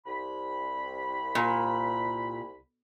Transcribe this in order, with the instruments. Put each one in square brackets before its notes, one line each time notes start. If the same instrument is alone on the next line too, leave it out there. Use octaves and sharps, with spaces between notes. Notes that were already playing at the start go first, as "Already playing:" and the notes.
[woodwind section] C2 B5
[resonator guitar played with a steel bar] A#2